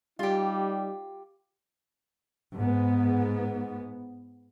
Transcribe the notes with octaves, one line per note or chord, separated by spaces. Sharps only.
G3 D#4 F4 G4
G#2 B3